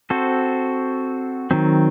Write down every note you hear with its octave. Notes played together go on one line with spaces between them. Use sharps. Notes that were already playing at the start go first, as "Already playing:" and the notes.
C4 F#4 A4 C5
D#3 F#3 C4